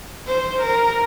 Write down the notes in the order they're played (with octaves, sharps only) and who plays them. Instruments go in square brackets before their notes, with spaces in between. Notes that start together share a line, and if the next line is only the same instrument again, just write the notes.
[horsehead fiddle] C5
A#4